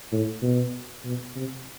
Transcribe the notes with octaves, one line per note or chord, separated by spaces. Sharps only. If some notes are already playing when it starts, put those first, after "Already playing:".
A2
B2
B2
C3